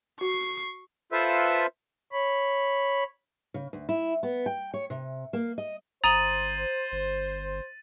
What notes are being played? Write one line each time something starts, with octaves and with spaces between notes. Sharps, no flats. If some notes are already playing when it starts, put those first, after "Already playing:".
F#4 C#6 C7
F4 A4 B4 C5 E5 E6
C#5 B5
C#3
D2
E4
B3
G5
C#5
C3
A#3
D#5
G1 C5 A#5 D#6 A6 D#7 F#7
G1